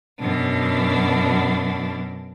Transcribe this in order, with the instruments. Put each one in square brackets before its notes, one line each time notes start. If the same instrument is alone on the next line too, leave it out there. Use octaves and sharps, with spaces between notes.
[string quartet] F#2 B2 D4